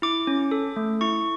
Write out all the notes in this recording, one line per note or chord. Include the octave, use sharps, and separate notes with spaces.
E4 D6
C#4
A4
A3
E4 C#6